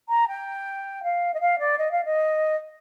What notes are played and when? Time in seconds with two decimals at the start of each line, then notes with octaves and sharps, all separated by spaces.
0.09 A#5
0.28 G5
1.03 F5
1.34 D#5
1.40 F5
1.59 D5
1.78 D#5
1.91 F5
2.04 D#5